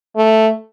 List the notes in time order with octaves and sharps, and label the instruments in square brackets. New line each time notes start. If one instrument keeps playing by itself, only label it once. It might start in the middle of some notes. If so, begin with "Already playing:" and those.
[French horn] A3